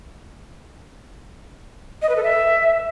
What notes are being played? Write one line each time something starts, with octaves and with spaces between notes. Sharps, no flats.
D#5
B4
A4
E5